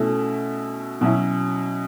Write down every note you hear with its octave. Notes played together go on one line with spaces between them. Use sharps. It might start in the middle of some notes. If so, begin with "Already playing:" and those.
Already playing: B2 A3 C#4 E4
B2 F#3 C#4 E4